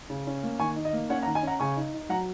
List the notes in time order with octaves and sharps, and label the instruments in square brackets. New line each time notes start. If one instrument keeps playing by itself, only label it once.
[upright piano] C#3
C#4
A#3
D#3 G#5 C#6
D#4
D#5
A#3
C#4 C#5 F#5
F#5 A#5
D#3
D#5 G#5
C#4 F#5 A#5
C#3 G#5 C#6
D#4
D#4
F#3 F#5 A#5